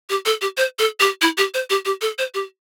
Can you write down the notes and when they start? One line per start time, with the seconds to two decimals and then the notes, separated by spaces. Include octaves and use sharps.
0.10 G4
0.26 A4
0.41 G4
0.57 C5
0.79 A4
1.00 G4
1.22 E4
1.38 G4
1.54 C5
1.70 G4
1.85 G4
2.01 A4
2.18 C5
2.34 G4